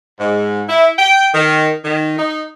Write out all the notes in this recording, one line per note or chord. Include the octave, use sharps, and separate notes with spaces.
G#2
E4
G5
D#3
D#3
D#4